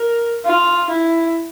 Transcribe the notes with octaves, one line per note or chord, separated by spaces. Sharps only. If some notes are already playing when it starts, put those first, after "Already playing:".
Already playing: A#4
F4
E4